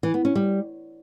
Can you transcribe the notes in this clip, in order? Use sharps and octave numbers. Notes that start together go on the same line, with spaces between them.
E3
B3
C#4
G3